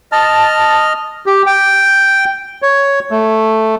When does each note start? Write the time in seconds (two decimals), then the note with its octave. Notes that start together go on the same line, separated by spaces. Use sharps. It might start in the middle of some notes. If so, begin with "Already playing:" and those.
0.12 D#5 A5 F6
1.26 G4
1.46 G5
2.62 C#5
3.11 A3